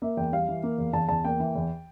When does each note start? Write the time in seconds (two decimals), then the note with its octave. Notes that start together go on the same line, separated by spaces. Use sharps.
0.02 A#3 E5
0.17 E2 G5
0.32 G3 F5
0.48 E3
0.63 A#3
0.78 E2
0.93 E2 A5
1.09 E2 A5
1.25 A#3 G5
1.40 E3
1.56 E2